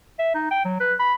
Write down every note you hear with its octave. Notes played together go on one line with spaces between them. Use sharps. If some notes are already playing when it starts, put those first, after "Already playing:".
E5
D#4
G5
F#3
B4
B5